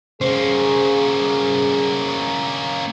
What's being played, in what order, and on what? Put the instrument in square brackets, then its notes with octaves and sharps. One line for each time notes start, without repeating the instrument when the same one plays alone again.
[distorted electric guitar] A#3 C#4 [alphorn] G#4 [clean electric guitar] C5